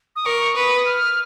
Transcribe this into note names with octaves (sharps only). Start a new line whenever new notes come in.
D#6
A#4 C#6
B4 D#6
D#6
F6